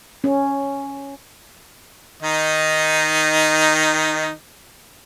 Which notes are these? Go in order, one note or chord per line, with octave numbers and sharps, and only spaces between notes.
C#4
D#3 D#4